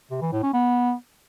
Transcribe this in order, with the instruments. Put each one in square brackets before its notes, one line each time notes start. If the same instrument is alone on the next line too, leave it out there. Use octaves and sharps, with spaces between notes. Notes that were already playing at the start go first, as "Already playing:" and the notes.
[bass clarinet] C3
E3
A2
C#4
B3